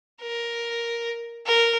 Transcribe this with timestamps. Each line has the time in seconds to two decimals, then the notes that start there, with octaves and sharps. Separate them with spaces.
0.22 A#4
1.46 A#4